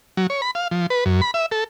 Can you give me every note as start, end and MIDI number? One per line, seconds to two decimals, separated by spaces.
0.17 0.27 54
0.30 0.41 73
0.42 0.51 83
0.55 0.68 77
0.71 0.86 53
0.90 1.04 71
1.05 1.21 42
1.22 1.31 83
1.34 1.46 76
1.51 1.64 69